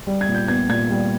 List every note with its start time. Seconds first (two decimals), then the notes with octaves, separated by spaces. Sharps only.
0.07 G3
0.21 G#6
0.28 A#2
0.35 G6
0.48 B3 G#6
0.69 A#2 G#6
0.90 G3